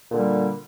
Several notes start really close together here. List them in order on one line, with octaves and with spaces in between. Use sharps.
A#2 D3 G3